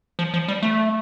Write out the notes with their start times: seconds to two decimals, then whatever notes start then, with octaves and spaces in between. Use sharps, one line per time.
0.19 F3
0.34 F3
0.48 G3
0.63 A3